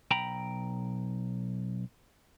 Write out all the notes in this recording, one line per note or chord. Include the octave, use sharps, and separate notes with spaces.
B1 G5 A#5 B5